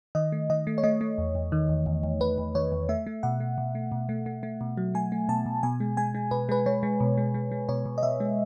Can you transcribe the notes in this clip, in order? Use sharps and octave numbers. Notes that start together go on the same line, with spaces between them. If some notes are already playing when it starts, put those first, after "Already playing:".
D#3 D#5
A3
D#3 D#5
A3
C#5
A3 D#5
A3
E2
E2
D#3
E2
E2
E2
E2 B4
E2
D#3 C#5
E2
A3 E5
A3
B2 F#5
A3
B2
A3
B2
A3
A3
A3
B2
F#3
A3 G#5
A3
B2 A5
B2
B2 G#5
G#3
G#3 G#5
G#3
B2 B4
G#3 B4
G#3 C#5
G#3
B2
G#3
G#3
G#3
B2 C#5
B2
D#5
B2 E5
G#3